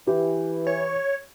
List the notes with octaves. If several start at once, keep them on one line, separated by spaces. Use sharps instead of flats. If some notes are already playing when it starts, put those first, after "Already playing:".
E3 G4
C#5